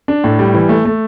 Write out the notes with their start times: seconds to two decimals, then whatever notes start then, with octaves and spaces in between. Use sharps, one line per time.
0.08 D4
0.24 A2
0.39 G3
0.54 E3
0.69 A3
0.85 A3